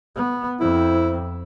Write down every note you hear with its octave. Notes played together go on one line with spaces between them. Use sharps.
B3
F2 C4 E4